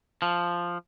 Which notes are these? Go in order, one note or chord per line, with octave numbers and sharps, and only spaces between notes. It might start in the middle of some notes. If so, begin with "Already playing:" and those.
F3